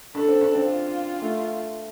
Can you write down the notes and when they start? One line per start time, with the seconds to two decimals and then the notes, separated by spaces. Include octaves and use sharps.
0.15 D4 A4
0.28 C4
0.41 D4
0.54 C4
0.68 F4
1.22 A3